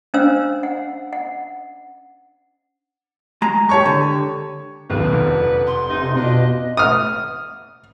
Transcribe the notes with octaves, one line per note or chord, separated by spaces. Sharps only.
C#4 D4 C5 F5 E6
F#5
F#5
G#3 A#5
G4 C#5 C#6
D3
D#1 B1 F#2 D#3 D4 B4
F1 F2
C6
D2 C3 E3 D#4
B2 C4 D4 F4 D#5
D#6 F6